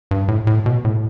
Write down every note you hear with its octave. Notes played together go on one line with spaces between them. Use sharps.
G2
A2
A2
B2
A2